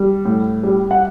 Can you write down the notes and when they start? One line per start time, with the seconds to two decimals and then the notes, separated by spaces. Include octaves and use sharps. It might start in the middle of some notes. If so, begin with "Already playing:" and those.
Already playing: G3
0.25 A2
0.63 G3
0.91 F#5